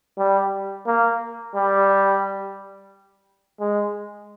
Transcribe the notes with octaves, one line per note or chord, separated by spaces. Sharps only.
G3
A#3
G3
G#3